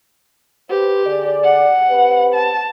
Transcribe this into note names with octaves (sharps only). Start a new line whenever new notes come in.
G4 B4 C5
D3 G#4 D5
F#5
C4 G4 B4
A5